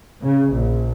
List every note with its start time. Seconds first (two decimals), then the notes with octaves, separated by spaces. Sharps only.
0.20 C#3
0.49 A#1